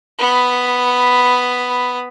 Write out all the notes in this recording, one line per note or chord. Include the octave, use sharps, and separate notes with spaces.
B3 B5